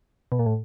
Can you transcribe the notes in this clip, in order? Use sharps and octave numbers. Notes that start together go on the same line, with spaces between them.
B2
A#2
A2